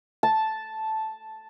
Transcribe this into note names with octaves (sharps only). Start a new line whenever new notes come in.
A5